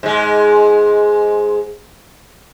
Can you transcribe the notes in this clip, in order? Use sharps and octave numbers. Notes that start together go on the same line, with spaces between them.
G#2 G#3